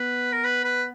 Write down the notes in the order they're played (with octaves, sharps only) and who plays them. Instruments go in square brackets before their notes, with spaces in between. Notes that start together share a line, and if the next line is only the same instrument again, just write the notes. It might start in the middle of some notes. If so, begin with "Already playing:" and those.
Already playing: [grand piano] B3 [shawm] B4
[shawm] A#4
B4
B4